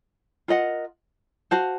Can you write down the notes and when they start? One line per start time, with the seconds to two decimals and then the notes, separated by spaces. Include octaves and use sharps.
0.48 F4 A#4 D#5 F#5
1.51 F#4 C5 F5 A5